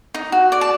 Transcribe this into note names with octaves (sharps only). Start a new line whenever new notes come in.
D#4
F#4
D5
A5